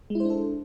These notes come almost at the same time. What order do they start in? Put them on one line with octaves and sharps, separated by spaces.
G#3 E4 C5 D4 A4